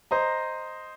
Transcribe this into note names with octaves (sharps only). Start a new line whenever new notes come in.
C5 D#5 A#5